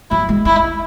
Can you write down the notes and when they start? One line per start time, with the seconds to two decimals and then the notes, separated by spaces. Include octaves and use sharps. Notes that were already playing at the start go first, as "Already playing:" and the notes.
0.11 F#3 E4
0.29 G#3
0.45 D#4 E4